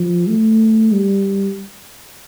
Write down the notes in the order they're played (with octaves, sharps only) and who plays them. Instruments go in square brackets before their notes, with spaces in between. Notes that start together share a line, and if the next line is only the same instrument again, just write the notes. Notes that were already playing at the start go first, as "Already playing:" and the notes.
Already playing: [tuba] F3
A3
G3